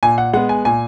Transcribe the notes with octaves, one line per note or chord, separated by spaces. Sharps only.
A#2 G#5
F#5
G#3 B3 F#5
G#5
A#2 G#5